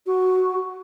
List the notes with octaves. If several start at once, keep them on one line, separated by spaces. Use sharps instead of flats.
F#4